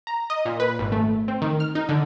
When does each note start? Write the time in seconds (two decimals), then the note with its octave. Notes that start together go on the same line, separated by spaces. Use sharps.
0.07 A#5
0.30 D#5
0.45 A#2
0.60 B4
0.79 G#1
0.92 A3
1.28 C4
1.42 D#3
1.60 F6
1.75 D#4
1.89 D3